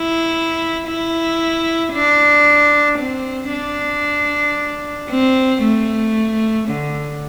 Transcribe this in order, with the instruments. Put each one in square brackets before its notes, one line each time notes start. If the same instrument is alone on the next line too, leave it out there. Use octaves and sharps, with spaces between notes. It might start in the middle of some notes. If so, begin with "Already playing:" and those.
Already playing: [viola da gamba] E4
E4
D4
C4
D4
C4
A3
D3